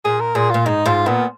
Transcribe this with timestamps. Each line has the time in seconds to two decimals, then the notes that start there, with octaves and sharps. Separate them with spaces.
0.05 A#2 G#4
0.21 A#4
0.35 A#2 G#4
0.50 A#2 F4
0.66 G#2 D#4
0.86 G#2 F4
1.06 A#2 B3